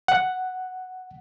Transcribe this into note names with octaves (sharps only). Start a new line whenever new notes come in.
F#5